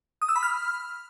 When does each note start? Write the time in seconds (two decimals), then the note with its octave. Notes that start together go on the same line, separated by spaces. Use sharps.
0.22 D#6
0.29 E6
0.36 B5
0.43 F6